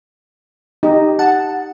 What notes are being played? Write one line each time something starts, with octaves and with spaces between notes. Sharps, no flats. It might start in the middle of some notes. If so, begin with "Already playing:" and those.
D#4 G4 D#5
F#5 A5